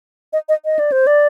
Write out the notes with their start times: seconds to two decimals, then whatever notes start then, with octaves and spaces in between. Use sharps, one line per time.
0.33 D#5
0.49 D#5
0.65 D#5
0.79 D5
0.92 C5
1.07 D5